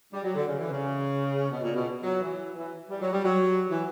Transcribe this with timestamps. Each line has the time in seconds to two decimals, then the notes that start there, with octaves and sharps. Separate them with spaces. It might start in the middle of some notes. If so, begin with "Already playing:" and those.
0.12 G3
0.24 F#3
0.35 D3
0.47 C#3
0.58 E3
0.70 C#3
1.51 B2
1.63 A#2
1.74 B2
2.03 F#3
2.21 E3
2.55 E3
2.89 G3
3.01 F#3
3.13 G3
3.24 F#3
3.70 E3